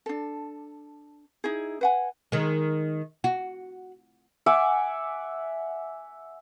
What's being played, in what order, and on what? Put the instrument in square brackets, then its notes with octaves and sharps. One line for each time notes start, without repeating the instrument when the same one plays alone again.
[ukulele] D4 A4
D#4 E4 G#4
B4 F#5 G#5
[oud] D#3 G#3
F#4
[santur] E5 F#5 G#5 D6